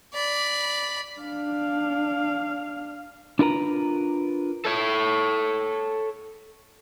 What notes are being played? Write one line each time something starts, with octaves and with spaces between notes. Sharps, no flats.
D5 B5
D4 F5
D4 E4 F4 A#4 B4 A#5
A4 C#5